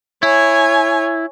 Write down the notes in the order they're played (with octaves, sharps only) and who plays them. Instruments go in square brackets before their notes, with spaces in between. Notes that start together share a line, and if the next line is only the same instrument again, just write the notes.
[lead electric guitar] E4 [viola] C#5 G#5